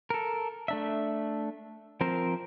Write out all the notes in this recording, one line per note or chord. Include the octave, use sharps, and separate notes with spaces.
A4 A#4
A3 D4 E5
F3 C4 A#4 C5